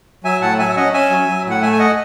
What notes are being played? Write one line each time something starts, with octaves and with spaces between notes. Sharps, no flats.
F#3 E5 G#5
A2 F#5 A5
F#3 E5 G#5
E5
C#4 D#5 F#5
C#4 E5 G#5
F#3
F#3
A2 F#5
A3 E5 G#5
G#5
D#5 F#5